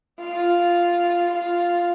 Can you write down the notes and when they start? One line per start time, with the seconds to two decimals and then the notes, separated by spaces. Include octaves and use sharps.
0.20 F4
1.31 F4